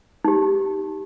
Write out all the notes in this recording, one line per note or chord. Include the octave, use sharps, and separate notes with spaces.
D#4 G4